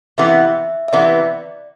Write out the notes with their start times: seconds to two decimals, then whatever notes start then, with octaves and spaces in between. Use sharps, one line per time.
0.18 C3 E3 B3 E5
0.88 E5
0.93 C3 E3 B3 D5